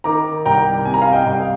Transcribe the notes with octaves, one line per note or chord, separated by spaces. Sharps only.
D#3 A#5 D6
C2 G5 A#5
C3 G#5
A#5
F5 G#5
D#5 G5
C2 G5
F5